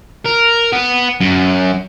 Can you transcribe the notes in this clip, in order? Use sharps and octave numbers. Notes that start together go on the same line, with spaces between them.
A#4
B3
F#2